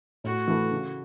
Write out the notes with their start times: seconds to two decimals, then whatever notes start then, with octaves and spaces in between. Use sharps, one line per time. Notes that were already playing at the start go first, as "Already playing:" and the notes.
0.24 A2 F#4
0.47 E3 A3
0.71 C#3